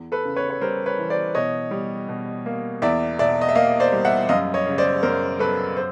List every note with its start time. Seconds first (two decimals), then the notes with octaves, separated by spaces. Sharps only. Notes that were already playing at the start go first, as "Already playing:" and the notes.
Already playing: E2
0.12 A4 B4
0.25 C#3
0.36 B4 C#5
0.50 C#5
0.61 G3 A#4 C5
0.86 B4 C#5
0.99 E3
1.10 C5 D5
1.35 B2 C#5 D#5
1.71 G3
2.08 B2
2.46 A#3
2.82 E2 D5 E5
3.19 B2 D5 E5
3.41 D#5
3.49 E5
3.55 A#3 D#5 F5
3.80 C5 D5
3.93 G3
4.05 E5 F#5
4.29 F#2 D#5 F5
4.54 C#5 D#5
4.67 C#3
4.78 C5 D5
5.03 F#2 A#4 C5
5.39 F#3 A4 B4
5.77 C5